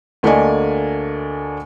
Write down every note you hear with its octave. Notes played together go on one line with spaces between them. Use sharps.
D2 A3 A#3 D4 D#5 G#5